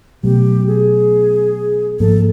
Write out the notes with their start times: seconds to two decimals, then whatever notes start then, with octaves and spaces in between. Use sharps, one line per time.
0.23 B2 F#3 A3 G4
0.67 G#4
1.99 G#2 F3 A#3 A4